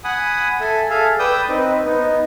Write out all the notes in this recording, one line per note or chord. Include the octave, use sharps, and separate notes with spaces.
F#5 G#5 B5 D#6
A4 E5 G#5
G#4 A4 E5 F5
B4 D5 G5 D#6 E6 G6
C4 D#4 B4
B3 D#4